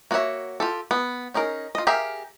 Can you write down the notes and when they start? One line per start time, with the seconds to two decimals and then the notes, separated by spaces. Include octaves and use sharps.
0.11 A#3 F#4 A4 C#5 E5
0.60 F4 G4 A4
0.91 B3
1.34 C#4 D#4 G#4 A#4
1.75 F4 D#5
1.87 G4 G#4 A#4 E5 F5